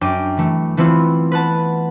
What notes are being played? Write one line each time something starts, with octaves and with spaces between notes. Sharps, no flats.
F#2 D4 G5 D6 D#7
E3 A3
E3 A3 B3 C4 E4 F4
B4 F#5 A5